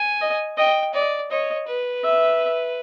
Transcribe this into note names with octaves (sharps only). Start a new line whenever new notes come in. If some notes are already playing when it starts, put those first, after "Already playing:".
Already playing: G#5
D#5
D#5 G5
D5 D#5
C#5 D#5
B4
E5